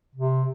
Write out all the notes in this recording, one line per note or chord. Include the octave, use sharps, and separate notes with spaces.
C3